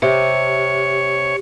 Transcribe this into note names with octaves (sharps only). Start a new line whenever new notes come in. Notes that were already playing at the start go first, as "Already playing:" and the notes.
C3 C#5